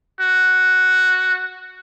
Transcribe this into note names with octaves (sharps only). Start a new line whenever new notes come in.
F#4